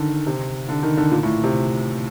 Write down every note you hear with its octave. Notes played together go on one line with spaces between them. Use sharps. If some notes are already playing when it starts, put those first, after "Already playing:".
Already playing: D3 D#3
C3
D3
D#3
D3
A#2
A2
C3